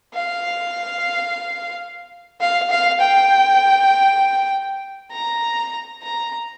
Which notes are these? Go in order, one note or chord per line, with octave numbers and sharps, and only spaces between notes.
F5
F5
F5
G5
A#5
A#5